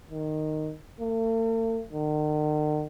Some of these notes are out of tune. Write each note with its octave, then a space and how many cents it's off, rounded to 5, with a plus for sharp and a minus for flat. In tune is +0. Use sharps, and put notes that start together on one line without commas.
D#3 -10
A3 +45
D#3 -45